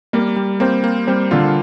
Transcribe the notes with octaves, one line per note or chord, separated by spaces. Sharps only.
G3 A#3
G3
A#3 C4
A#3
G3 C4
D3 F4